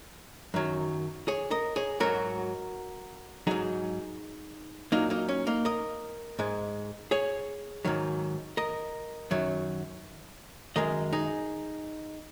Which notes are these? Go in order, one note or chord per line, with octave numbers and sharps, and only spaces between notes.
F#2 D#3 F#3
G#4 C#5
A#4 D#5
G#4 C#5
G#2 F#3 F#4 A#4
G#2 F#3 D#4 G#4
A#2 F#3 A#3 D#4
A#3 D#4
C#4
A#3 D#4
A#4 D#5
G#2 G#3
G#4 C#5
G#2 D#3 F#3
A#4 D#5
F#2 D#3 F#3
F#2 D#3 G#3 A#4 D#5
D#4 G#4